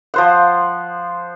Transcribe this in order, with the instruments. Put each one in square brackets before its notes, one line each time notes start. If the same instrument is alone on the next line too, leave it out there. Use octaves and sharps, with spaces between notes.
[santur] F3 C5 F#5